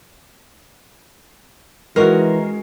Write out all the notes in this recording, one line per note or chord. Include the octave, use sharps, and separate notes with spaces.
D#3 E3 G#3 C#4 F#4 A#4